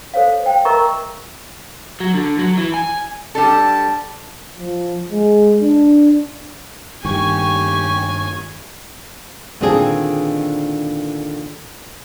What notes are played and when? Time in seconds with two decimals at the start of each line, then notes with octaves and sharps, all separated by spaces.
0.14 A4 C5 C#5 F5
0.43 C5 G5
0.65 A#4 D#5 E5 A#5 C#6 D6
2.00 F#3
2.14 D3
2.39 F#3
2.57 E3
2.74 G#5
3.35 G3 D4 A4 A5
4.58 F3
5.11 G#3
5.61 D4
7.05 G2 D#3 G4 G#5 C#6
9.61 A#2 D3 D#3 C4 D4 G#4